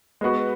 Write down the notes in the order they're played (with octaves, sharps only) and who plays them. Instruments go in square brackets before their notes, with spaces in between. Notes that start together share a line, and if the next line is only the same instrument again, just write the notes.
[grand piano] G#3 B3 F#4 B4